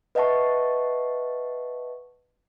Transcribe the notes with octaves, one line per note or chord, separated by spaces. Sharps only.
B4 D#5 E5 F#5 A5 C#6